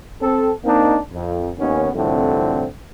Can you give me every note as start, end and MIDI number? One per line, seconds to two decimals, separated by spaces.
0.22 0.51 60
0.22 0.51 69
0.65 0.98 58
0.65 0.98 60
0.65 0.98 62
0.65 0.98 63
1.13 1.51 41
1.58 1.89 39
1.58 1.89 51
1.58 1.89 59
1.58 1.89 61
1.93 2.66 36
1.93 2.66 41
1.93 2.66 45
1.93 2.66 50
1.93 2.66 60